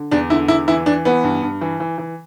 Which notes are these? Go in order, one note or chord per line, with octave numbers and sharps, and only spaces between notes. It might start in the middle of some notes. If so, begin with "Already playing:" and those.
Already playing: D3
E2 D4
D3 E4
E2 E4
E3 E4
E3 D4
E3 B3
G2
G2
E3
E3
E3